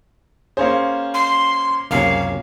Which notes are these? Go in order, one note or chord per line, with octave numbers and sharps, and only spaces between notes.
A#3 C#4 G#4 C5
C6
C#2 F#2 C3 A#3 C#4 F5